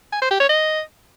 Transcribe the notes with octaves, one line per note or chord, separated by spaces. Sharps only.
G#5
C5
G4
C#5
D#5